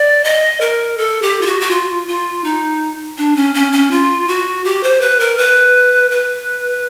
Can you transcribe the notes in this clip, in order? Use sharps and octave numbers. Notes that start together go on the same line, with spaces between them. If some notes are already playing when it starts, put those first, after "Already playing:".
Already playing: D5
D#5
A#4
A4
G4
F4
F#4
F#4
F4
F4
D#4
D4
C#4
C#4
C#4
F4
F#4
G4
C5
B4
A#4
B4
B4